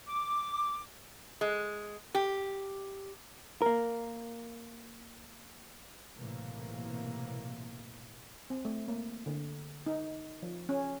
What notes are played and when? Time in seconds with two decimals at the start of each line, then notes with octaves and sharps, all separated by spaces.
0.07 D6
1.41 G#3
2.15 G4
3.62 A#3 A#4
6.16 B1 A2 C3 E3 A#3
8.50 C4
8.65 A3
8.88 A#3
9.26 D3
9.86 D#4
10.42 F3
10.69 C#4